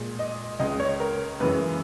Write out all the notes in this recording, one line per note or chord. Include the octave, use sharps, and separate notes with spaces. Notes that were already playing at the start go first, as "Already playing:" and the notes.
Already playing: A#2 G#3
D#5
C#2 C#3 G#3 D#5
C#5
A#4
F#2 C#3 E3 G#3 B4